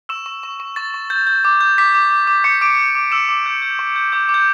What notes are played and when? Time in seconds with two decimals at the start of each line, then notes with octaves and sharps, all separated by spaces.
0.09 C#6 E6 E7
0.26 C#6
0.43 C#6
0.60 C#6
0.76 C#6 A6
0.94 C#6
1.10 G6 A6
1.27 G6
1.45 D6
1.61 G6
1.78 D6 B6
1.95 D6
2.11 D6
2.27 D6
2.44 C#6 G6 C#7
2.61 D6 D7
2.79 G6
2.95 D6
3.11 D6 E6 E7
3.29 D6
3.46 G6
3.62 G6
3.79 C#6
3.96 G6
4.12 D6 G6
4.29 D6
4.34 G6